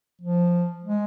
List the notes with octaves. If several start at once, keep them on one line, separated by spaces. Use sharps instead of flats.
F3
G#3